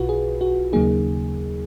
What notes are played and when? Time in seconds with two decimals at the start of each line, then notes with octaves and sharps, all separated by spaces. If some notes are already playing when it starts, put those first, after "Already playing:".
Already playing: B1 B2 F4 F#4 B4
0.09 G#4
0.41 F#4
0.72 D#2 C#3 F#3 A#3 D#4 G#4